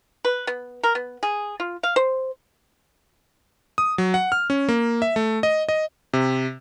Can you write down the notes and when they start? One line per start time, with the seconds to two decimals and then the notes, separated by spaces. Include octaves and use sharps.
0.25 B4
0.47 B3
0.83 A#4
0.95 B3
1.23 G#4
1.60 F4
1.83 F5
1.96 C5
3.78 D#6
3.98 F#3
4.14 F#5
4.32 F6
4.50 C#4
4.69 A#3
5.02 E5
5.16 A3
5.43 D#5
5.69 D#5
6.13 C3